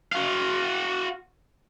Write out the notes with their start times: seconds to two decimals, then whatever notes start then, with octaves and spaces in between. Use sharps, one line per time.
0.12 F#4 F5